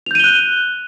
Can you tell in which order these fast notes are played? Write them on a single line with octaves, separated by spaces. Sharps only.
F7 G6 D#7 G7 F#6